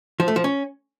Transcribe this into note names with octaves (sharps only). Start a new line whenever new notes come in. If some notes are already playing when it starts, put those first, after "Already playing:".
F3
A3
F3
C#4